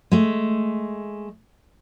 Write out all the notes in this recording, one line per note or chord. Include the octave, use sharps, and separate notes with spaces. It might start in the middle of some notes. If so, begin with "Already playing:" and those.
G#3 A3